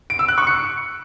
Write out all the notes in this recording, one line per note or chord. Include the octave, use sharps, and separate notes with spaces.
D7
E6
F#6
C#6
C#7